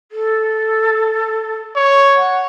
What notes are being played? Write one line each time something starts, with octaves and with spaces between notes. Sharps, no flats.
A4
C#5
F#5